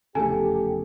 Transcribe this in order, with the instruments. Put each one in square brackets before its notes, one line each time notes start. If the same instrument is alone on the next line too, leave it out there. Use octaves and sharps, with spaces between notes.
[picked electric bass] F1 E2 C#3 [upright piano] A3 A4 [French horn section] G4 [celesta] G#5